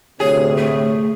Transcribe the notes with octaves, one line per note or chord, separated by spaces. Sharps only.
D2 A2 C3 G#4 C#5
A3